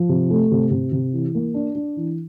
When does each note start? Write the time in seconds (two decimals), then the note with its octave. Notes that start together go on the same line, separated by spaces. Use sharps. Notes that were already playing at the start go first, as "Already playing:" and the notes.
Already playing: F3
0.09 C3
0.30 A3
0.51 C3
0.71 C3
0.92 C3
1.13 E3
1.35 A#3
1.54 D4
1.75 D4
1.96 E3